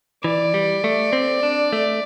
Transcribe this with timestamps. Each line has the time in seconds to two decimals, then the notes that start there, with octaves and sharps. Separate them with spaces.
0.24 E3 D5
0.54 G3
0.84 A3
1.13 C4
1.43 D4
1.73 A3